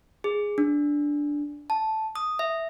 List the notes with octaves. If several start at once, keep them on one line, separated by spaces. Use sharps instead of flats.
G#4
D4
A5
D#6
E5